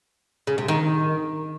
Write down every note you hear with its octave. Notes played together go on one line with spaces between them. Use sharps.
C#3
C3
D#3